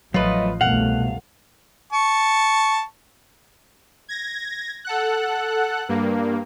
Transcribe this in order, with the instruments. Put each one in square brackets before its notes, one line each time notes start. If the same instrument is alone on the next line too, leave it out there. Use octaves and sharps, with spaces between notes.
[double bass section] A1 F3 [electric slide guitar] F#3 A3 [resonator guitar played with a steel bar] F4 B4 [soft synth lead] D#5
[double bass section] C2 F#2 A3 [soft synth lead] B2 [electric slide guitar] F5 [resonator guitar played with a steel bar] F#5
[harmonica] A5 C#6
[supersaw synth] G#6 A#6
A4 F#5 F#6
G2 A#3